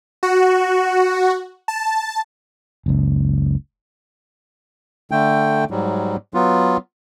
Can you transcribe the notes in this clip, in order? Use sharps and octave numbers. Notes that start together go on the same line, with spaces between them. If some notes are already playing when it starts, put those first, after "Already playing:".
F#4
A5
F#1 C#2
D3 A3 G5
G#2 F#3 G3
F#3 B3 F4